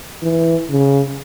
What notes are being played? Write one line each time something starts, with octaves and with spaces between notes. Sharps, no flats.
E3
C#3